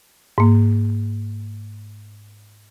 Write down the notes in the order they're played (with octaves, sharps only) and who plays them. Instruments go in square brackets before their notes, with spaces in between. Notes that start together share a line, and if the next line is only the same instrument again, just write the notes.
[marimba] G#2 A#3